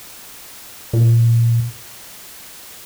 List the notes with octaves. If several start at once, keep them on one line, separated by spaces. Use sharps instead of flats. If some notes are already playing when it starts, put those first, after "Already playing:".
A#2